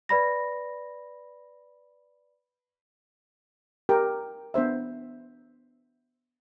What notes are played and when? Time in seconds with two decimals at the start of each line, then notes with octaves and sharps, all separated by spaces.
0.09 B4 D5 B5 A#6
3.89 G4 A#4 G5
4.54 B3 D4 C5 E5